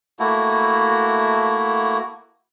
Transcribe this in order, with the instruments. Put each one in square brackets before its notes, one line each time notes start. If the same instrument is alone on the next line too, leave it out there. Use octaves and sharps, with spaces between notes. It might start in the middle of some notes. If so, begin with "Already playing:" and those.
[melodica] A3 A#3 E4 F#4